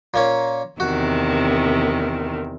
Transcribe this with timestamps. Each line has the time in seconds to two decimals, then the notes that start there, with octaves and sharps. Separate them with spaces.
0.14 A#2 A#3 C#4
0.80 E2 C3 D#3 F#4